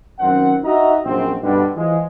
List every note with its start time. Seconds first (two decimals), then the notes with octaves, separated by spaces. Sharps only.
0.20 F#2 D#3 C4 F#5
0.64 D#4 F#4 D#5 E5 A#5
1.05 A#1 F#2 C4
1.42 G2 B2 D3 G3
1.76 E3 F3 G#3